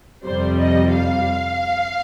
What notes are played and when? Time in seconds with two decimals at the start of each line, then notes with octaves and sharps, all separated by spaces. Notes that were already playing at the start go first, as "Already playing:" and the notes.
0.24 F2 C3 G3 C5
0.60 D#5
0.95 F5